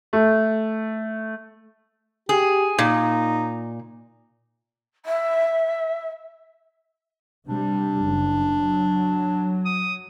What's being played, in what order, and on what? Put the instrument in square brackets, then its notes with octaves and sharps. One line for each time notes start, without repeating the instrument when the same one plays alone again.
[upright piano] A3
[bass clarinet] G4 [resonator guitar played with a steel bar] G#4
[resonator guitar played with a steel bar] A#2 [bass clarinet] D#4
[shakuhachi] E5
[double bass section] C3 G3 [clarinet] D4
[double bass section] F#1
F#3
[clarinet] D#6